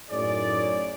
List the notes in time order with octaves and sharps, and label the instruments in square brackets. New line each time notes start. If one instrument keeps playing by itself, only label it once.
[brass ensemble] F#2 A2 D#4 G#4 C#5 D5